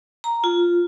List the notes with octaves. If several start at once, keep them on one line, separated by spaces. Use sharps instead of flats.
A#5
F4